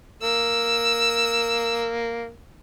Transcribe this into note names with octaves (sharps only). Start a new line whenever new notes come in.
A#3 E6